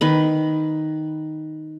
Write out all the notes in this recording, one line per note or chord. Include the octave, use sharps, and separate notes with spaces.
D#3 B4 B5